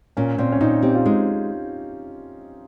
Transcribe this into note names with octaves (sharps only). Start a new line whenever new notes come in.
A#2 C#4
A#2 C4
C#4
A#2 D#4
C4 G4
F4
G#3 D#4